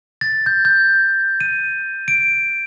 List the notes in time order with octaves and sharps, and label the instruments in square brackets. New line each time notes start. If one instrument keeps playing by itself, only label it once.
[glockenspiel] A6
G6
G6
D#7
D7